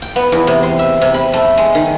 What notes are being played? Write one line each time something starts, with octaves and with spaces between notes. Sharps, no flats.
G5
B3
E2
C3
C6
E5
C3
B5
A3
G#3
D#3